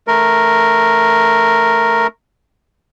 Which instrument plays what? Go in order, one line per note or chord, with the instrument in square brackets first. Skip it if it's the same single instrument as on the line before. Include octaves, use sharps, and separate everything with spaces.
[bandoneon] A3 A#4